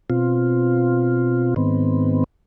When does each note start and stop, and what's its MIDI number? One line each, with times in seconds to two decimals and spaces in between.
0.10 1.54 47
0.10 1.54 60
0.10 1.54 65
1.56 2.24 44
1.56 2.24 51
1.56 2.24 59
1.56 2.24 60